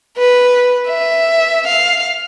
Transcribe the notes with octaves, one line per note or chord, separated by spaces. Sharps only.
B4
E5
F5